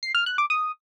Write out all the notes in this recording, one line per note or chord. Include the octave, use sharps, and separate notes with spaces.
C7
F6
F#6
D6
D#6